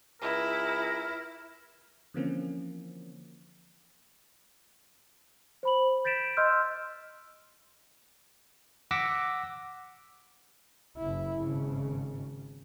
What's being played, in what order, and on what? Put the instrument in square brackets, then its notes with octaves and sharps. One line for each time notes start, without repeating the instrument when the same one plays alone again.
[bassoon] C#2 [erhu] E4 [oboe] A#4
[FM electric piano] D3 E3 F3 A#3 C4 C#4
[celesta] C5 B5 F#7
G6 A6 B6 D7 E7
D#5 C6 E6 F6 G6
[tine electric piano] F#5 D6 E6 A#6 B6
[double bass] F#1 E4
G#1 C#3